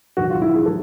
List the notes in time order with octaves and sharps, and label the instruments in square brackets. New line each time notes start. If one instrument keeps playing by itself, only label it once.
[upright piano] E1 D#2 D#3 F#3 F#4
F4
E4
G#4
D#3 F#3 A4